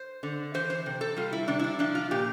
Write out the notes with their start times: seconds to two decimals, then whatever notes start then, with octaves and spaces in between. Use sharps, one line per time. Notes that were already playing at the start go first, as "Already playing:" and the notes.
Already playing: C5
0.23 D3
0.54 E3 C5
0.70 C5
0.86 C3
1.01 A4
1.16 G3 F4
1.33 E4
1.48 C3 D4
1.59 E4
1.64 D4
1.79 F3 D4
1.95 F4
2.11 A#2 G4